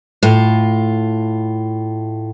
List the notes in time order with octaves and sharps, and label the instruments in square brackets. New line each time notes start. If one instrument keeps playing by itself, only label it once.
[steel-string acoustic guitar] A2 F4